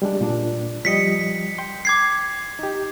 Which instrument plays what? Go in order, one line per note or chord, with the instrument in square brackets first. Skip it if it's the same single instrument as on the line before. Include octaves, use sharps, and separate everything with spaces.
[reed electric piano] G3 G#3 D4
A#2 D4
[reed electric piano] F3 G3 D#5 [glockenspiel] B6 C#7
[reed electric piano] G5 C6
[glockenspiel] D6 G#6 C7
[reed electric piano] D#4 G4